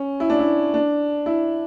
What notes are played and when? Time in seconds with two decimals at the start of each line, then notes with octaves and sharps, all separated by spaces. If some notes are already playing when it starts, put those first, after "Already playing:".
Already playing: C#4
0.20 E4
0.30 D4
0.39 E4
0.74 D4
1.26 E4